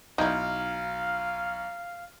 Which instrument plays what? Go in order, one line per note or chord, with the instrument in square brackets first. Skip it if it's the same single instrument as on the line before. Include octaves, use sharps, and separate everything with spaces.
[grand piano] B1 [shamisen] D#4 E4 [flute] F5